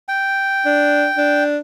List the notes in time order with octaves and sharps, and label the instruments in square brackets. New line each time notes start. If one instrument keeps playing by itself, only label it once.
[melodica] G5
[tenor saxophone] D4
D4